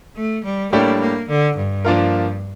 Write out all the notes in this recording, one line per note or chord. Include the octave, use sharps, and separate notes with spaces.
A3
G3
A2 G3 A#3 D4 G4 C#5
A#3
D3
G2
F3 A#3 D4 F4 A#4